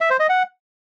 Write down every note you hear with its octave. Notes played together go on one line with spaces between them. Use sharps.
E5
C5
D#5
F#5